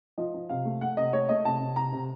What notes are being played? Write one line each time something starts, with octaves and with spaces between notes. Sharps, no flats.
F3 D#5
F3
C3 F5
A3
A3 F#5
C3 D#5
A3 C#5
A3 D#5
C3 A5
C3
C3 A#5
C3